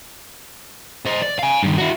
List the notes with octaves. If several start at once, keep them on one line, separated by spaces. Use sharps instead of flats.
C5 D#5
D5
F5 G#5
G2 D#3
E4 F#4